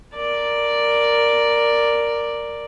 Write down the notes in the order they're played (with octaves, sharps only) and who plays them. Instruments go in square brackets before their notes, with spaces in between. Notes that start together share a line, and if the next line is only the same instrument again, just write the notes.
[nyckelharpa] A#4 D5